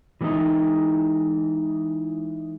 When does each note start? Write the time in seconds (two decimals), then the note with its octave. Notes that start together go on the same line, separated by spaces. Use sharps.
0.21 E3 G3 G#3 B3 D#4 E4